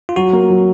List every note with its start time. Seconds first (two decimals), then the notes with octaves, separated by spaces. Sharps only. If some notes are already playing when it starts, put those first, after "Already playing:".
0.09 F4
0.16 F#3 F#4
0.33 A#3
0.50 F#3